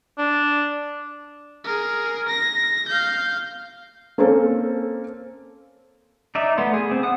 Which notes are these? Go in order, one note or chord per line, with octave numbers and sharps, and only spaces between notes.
D4
G#4 A#4
A#6
F5 G6
A#3 C4 C#4 A4
D#4 D5 E5
A3 B3 C6
G#4
C4
F#5 D#6